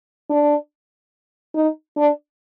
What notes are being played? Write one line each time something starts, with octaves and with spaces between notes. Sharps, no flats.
D4
D#4
D4